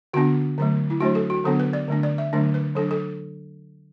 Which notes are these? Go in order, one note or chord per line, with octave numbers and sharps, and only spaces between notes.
D3 B3 D4 F#4
D3 F#3 A3
E4
F#3 A3 D4 F#4
A4
F#4
D3 F#3 B3 D4 A4
B4
D5
D3 A3 D4
D5
E5
D3 F#3 A3 D4
B4
F#3 D4 A4
A4